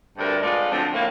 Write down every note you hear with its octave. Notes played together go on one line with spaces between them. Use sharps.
D2 G2 C3 D4 A4 A#4
G#3 A3 C4 F4 B4 D5
D3 F3 F#3 A3 C4 D4
A2 A#3